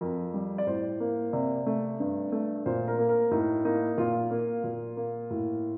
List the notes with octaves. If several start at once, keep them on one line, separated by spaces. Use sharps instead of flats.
F2 A#4
G3
D5
A2 C5
A#3
C3 D5
A3
G2
A3
A#2 C5
A#4
A#3
A#4
A2 D#4
A#3 D#4
A#2 F4
A#3
A#2
A#3
A2